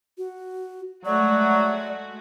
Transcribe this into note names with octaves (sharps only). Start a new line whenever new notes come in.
F#4
F#3 G#3 A3 F#4 D5